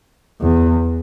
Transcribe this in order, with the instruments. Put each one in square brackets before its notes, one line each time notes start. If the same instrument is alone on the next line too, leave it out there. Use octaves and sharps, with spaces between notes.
[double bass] E2